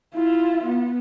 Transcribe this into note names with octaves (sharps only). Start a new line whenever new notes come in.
E4 F4
B3